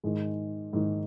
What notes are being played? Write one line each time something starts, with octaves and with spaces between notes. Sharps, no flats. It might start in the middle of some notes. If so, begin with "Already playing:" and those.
G#2 D#3 G#3
G#2 D#3